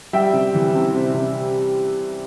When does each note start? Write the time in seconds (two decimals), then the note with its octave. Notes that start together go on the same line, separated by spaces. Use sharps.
0.13 G3 E5 G5
0.33 C3
0.54 E3
0.74 C3
0.95 C3
1.14 C3